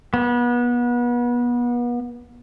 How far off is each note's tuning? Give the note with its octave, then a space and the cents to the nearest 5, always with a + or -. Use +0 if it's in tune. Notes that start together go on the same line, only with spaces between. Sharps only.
B3 -30